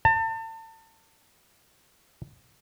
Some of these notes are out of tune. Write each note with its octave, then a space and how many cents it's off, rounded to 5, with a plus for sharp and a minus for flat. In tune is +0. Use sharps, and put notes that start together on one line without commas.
A5 +35